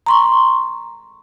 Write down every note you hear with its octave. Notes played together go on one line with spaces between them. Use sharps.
A#5 C6 C#6